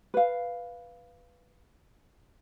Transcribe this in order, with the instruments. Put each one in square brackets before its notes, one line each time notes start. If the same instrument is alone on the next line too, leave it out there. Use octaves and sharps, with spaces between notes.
[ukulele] B4 F5